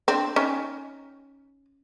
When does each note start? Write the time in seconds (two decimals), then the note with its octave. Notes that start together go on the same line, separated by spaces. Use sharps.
0.08 C4 D4
0.36 C#4 D#4